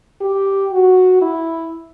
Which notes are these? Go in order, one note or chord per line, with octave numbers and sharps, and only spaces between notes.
G4
F#4
E4